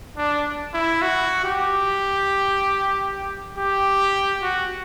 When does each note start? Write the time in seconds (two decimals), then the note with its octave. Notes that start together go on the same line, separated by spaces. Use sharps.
0.17 D4
0.74 E4
1.02 F#4
1.44 G4
3.57 G4
4.42 F#4